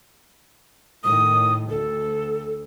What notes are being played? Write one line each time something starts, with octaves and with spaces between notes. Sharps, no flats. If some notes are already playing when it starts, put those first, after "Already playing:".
A2 D#3 D#6
D2 A4